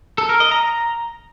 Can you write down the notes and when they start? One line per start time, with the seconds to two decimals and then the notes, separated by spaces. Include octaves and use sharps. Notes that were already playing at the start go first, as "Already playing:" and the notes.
0.18 A4
0.29 A#4
0.40 D#5
0.51 A#5